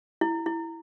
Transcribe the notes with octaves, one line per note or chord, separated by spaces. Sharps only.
E4
E4